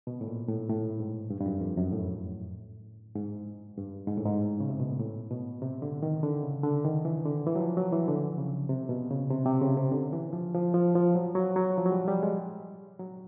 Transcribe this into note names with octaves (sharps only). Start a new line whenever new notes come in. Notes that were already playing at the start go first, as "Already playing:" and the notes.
B2
A2
A#2
A2
A2
G#2
G2
G2
F#2
F2
F#2
A2
G#2
G2
G#2
A2
G#2
C#3
C3
B2
A#2
A2
B2
C3
D3
D#3
D3
C#3
D3
D#3
E3
D3
E3
F#3
F3
F#3
E3
D3
C#3
C3
B2
C#3
C3
C3
C#3
C3
D3
E3
F3
F3
F3
F3
F#3
F#3
F#3
F3
F#3
G3
G3
G#3
F#3